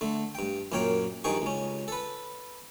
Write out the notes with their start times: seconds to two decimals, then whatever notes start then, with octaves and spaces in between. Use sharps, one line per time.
0.01 D3 A3
0.35 G2 G5
0.72 F#2 A#2 A#3 C#5 G5
1.24 G2 D#3 F3 G#4 G5 C#6
1.42 C#2 C#4
1.88 A4 B4